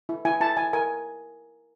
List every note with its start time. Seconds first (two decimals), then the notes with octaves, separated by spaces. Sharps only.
0.09 E4
0.25 E4 G#5
0.41 E4 A5
0.57 E4 G#5
0.73 A#4 G#5